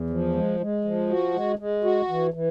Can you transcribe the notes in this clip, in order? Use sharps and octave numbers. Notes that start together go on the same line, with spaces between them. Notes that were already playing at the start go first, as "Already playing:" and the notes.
Already playing: E2
F3
G#3
G#3
F3
F#4
G#3
G#3
F#4
E3
E3